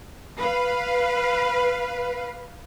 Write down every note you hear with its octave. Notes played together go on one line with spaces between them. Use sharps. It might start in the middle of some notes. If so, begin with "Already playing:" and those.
B4 F5